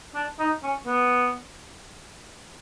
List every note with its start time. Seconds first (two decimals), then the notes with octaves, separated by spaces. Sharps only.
0.15 D4
0.39 D#4
0.63 C#4
0.86 B3